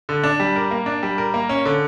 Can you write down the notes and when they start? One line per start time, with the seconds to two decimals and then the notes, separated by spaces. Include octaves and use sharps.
0.09 D3
0.23 D4
0.40 G3
0.56 A#4
0.71 A#3
0.86 D4
1.03 G3
1.18 A#4
1.34 A#3
1.49 C#4
1.65 D3